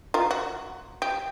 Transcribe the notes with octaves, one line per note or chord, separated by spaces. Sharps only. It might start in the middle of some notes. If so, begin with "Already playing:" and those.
F4 A#4
F#4
G4